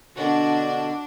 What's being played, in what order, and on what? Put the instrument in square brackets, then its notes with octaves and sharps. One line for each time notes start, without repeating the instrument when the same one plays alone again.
[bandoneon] B2 D3 [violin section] D4 [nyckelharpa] F#4